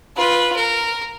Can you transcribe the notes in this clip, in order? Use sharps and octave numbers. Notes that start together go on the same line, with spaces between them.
F4 B4
A#4